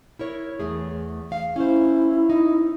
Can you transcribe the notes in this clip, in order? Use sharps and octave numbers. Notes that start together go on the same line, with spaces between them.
E4 A#4 C#5
E2 A3 G#4
F5
C#4 E4 C5
D#4